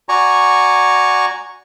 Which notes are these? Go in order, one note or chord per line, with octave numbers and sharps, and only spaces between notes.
F#4 D5 G#5 A#5 C#6